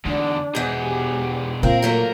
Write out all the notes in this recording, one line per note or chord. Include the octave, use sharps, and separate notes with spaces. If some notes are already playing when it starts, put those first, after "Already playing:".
E2 D3 D4 E4
E2 G#2 B2 G#4
G4
A#2 C4 F4 A#4 F5
F3 F#3 A3 A#3